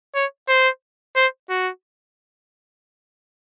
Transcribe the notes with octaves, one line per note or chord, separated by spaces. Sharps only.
C#5
C5
C5
F#4